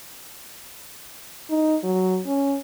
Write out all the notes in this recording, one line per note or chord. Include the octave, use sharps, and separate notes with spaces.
D#4
F#3
C#4